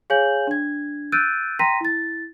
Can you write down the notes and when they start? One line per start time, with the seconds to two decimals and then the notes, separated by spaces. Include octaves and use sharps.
0.10 G#4 C#5 F5 G#5 G6 F#7
0.47 D4 G#6
1.12 E6 F#6 G6 A6 D7 D#7
1.59 G5 A#5 C6 A#6 B6 D#7
1.81 E4 A6